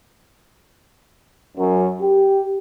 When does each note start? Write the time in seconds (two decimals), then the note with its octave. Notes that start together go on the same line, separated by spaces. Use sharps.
1.57 F#2
2.01 G4